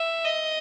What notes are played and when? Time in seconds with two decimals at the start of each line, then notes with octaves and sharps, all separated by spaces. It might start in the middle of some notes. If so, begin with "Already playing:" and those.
Already playing: E5
0.25 D#5